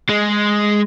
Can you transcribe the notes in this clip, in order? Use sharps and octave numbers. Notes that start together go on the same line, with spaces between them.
G#3